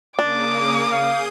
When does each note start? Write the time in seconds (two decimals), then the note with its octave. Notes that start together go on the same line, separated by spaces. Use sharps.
0.19 C#3 A#3 D4 D6 D#6
0.92 G#4 F5 D#6 G6